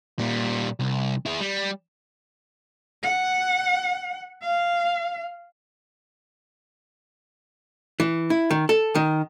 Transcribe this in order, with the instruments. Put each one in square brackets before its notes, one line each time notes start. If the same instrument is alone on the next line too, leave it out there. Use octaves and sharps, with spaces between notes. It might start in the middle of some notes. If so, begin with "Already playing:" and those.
[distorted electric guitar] A#2 G3
C2
E4 G#4
G3
[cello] F#5
F5
[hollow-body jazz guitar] E3
E4
D#3
A4
D#3